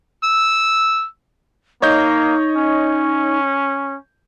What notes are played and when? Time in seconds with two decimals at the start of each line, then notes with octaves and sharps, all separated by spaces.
0.23 E6
1.82 A#3 D#4 C#5 D#5 G6
2.56 C#4